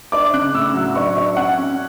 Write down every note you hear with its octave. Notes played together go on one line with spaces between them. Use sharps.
D4 D6
C#3 F#6
A2 E6
F#3
D4 C#6
D4
C#4 F#5
C#4